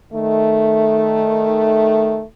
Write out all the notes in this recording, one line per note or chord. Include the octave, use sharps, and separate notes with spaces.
D#3 A3